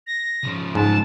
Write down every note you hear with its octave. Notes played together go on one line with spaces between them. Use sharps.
A#6
C#3 F3
G#2 A5